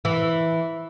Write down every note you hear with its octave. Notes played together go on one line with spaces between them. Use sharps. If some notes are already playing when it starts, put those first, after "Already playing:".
E3